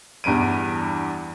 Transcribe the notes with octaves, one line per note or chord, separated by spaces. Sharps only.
E2 G2 G3 D7 D#7